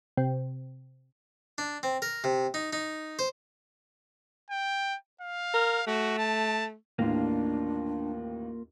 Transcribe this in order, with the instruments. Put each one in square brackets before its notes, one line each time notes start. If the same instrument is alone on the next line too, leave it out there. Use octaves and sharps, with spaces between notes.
[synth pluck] C3
[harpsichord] D4
C4
A#4
C3
D#4
D#4
C5
[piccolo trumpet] G5
F5
[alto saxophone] A#4
[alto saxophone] A3 [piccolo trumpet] F#4
[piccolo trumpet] A5
[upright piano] A1 D#2 A2 [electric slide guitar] A#3 F4 [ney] D4